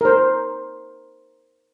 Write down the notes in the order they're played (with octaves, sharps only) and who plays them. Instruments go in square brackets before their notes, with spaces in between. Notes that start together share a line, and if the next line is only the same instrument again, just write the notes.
[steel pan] A#4 C5